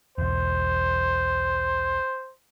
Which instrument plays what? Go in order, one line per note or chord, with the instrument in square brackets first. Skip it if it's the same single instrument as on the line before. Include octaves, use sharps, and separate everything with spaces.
[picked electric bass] B1 E2 [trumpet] C5